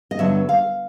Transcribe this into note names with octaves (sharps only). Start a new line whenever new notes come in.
D#5
G2 D3 F#3 B3 E5
F5